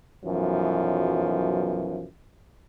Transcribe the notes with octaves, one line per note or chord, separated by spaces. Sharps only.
B1 F#2 E3 F3